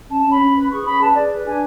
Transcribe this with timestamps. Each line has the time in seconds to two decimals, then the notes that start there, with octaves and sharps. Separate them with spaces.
0.09 C#4 A5
0.19 A5
0.24 C#4
0.29 B5
0.40 C#4
0.55 B4
0.70 G#4 C#6
0.85 C#4 B5
1.00 B4 A5
1.15 G#4 D5
1.31 B4
1.46 D4 G#5